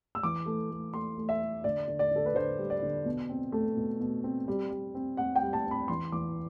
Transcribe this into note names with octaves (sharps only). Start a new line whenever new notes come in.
E6
E3 D6
A3
A3
A3 C6
A3
E5
A3
D3 D5
D3
D5
D3 A4
B4
D3 C5
G3
D5
D3
B2
C4
A3
B2
B2
C4
G3
G3
C4
C4 F#5
G5
G3
A5
C4
B5
E3 C6
E3 D6